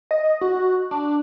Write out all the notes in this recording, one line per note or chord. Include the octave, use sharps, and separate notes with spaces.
D#5
F#4
D4